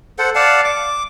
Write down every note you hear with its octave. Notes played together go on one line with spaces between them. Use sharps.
A4 C5 F#5
D5 F5 F#5 A5
D6